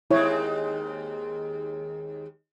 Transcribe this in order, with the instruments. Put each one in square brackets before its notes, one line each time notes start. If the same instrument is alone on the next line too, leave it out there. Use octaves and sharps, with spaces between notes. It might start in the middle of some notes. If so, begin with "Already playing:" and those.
[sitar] D#2 G#3 C4 [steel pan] E4 C#5